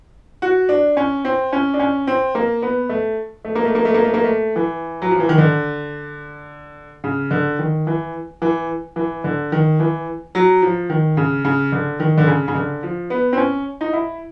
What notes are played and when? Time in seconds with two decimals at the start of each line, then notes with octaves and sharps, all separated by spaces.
0.42 F#4
0.69 D4
0.97 C#4
1.25 C4
1.53 C#4
1.74 D4
1.80 C#4
2.07 C4
2.35 A#3
2.62 B3
2.89 A3
3.45 A3
3.55 A#3
3.65 A3
3.75 A#3
3.85 A3
3.94 A#3
4.04 A3
4.14 A#3
4.24 A3
4.56 E3
5.02 F#3
5.11 F3
5.20 E3
5.29 D#3
5.38 D3
7.04 C#3
7.31 D3
7.59 D#3
7.87 E3
8.42 E3
8.96 E3
9.24 D3
9.52 D#3
9.80 E3
10.35 F#3
10.62 F3
10.90 D#3
11.17 C#3
11.45 C#3
11.72 D3
12.00 D#3
12.17 D3
12.27 C#3
12.48 C#3
12.55 D3
12.83 F3
13.10 B3
13.33 C4
13.37 C#4
13.81 D#4
13.93 E4